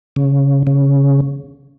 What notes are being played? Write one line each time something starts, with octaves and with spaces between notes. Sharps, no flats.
C#3
C#3